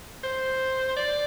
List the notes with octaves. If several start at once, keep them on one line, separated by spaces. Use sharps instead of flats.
C5
D5